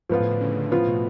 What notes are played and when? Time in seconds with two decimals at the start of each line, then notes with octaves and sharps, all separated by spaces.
0.09 G#2 F3 B3 F4
0.20 A2
0.31 D3
0.41 C#3
0.71 A2 F3 B3 F4
0.87 B2